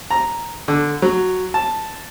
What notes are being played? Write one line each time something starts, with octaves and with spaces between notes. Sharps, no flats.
A#5
D3
F#3
A5